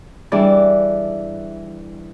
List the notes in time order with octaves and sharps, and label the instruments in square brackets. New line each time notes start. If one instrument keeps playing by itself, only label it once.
[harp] E3 G3 D4 G#4 D5